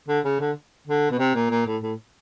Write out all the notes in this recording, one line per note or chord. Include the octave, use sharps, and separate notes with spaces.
D3
C#3
D3
D3
B2
C3
A#2
A#2
A2
A2